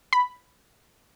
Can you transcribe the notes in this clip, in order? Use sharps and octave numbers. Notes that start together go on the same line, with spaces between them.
B5